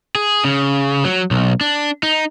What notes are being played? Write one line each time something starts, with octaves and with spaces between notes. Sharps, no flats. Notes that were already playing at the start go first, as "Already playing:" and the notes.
G#4
C#3
F#3
B1
D4
D#4